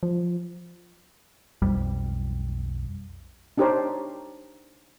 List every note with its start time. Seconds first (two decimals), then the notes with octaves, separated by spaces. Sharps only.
0.03 F3
1.62 B1 F2 G3
3.58 D4 D#4 G4 A#4 C5 C#5